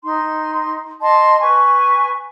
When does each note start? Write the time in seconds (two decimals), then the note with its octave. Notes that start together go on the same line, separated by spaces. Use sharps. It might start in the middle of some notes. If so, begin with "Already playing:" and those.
0.04 D#4 C6
1.02 D#5 A5 C6
1.41 B4 G#5 C#6